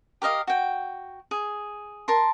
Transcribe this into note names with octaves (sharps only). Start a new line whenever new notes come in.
G4 A#4 D#5 F5
F#4 G5
G#4
A#4 A5 C6